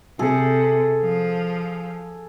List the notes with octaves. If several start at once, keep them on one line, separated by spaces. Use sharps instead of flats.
C3 G#4 A4
F3